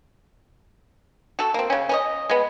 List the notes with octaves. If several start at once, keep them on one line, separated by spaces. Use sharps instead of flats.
F#4 A4
A#3 C4
C#3 C#4
C#4 A#4 D#5
G#3 B3